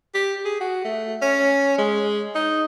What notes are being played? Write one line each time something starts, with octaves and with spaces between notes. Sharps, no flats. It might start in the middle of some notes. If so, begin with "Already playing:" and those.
G4
G#4
F#4
A3
C#4
G#3
D#4